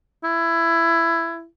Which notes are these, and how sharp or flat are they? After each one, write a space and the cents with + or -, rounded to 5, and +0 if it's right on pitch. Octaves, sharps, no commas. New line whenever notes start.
E4 +15